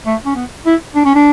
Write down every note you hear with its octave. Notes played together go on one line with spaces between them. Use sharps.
A3
C#4
B3
E4
D4
C#4
D4